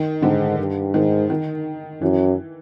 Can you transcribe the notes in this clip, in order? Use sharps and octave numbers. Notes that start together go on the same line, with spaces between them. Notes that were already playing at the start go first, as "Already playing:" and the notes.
Already playing: D#3
G#2 D3
G2
G#2 D#3
D#3
F#2 E3